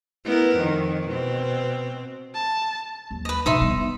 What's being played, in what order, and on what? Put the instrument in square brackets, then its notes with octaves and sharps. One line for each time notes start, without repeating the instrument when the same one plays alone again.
[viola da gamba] B3 E4 A#4
F2 D#3
B2 C4
[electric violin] A5
[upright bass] D#2 F#3
[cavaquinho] B4 D#5
[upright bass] B2 D3 [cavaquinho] D#4 E5 C6
[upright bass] G3 B3